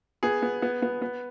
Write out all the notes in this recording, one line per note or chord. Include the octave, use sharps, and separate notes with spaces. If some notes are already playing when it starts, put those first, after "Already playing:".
B3 G#4
B3
B3
B3
B3